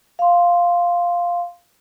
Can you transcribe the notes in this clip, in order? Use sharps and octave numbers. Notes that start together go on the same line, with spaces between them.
F5 C6